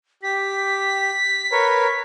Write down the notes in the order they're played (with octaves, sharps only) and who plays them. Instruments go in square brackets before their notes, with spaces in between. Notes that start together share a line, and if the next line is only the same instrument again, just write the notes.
[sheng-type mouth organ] G4 [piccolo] B6
[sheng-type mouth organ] A#4 B4 C#5